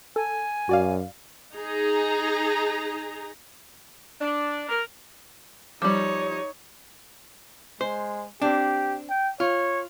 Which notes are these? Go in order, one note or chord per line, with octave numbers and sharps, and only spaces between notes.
A4 G#5
F#2 F#4 D5 F5
D#4 G#4 A#5
D4
A#4
F3 G3 D#4 C#5 D6
G#3 C5
C4 D4 G4
G5
F4 C#5